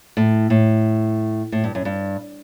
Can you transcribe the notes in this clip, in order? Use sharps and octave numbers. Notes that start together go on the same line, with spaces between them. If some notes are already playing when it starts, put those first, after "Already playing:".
A2
A2
A2
G2
F#2
G2